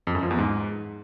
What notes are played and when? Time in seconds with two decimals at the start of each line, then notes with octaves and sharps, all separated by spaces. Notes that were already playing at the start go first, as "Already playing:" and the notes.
0.07 F2
0.15 F#2
0.23 F3
0.31 E2
0.38 G#2